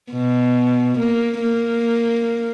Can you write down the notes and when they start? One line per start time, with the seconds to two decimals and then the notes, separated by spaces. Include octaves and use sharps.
0.12 B2
0.99 A#3
1.41 A#3